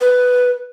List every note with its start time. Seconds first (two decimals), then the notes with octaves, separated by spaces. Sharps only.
0.01 B4